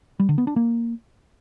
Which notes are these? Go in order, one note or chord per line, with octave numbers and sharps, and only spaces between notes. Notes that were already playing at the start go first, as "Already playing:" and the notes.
G3
D3
B3
D4
A#3